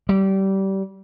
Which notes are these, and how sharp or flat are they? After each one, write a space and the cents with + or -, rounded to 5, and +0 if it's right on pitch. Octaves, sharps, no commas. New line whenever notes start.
G3 -25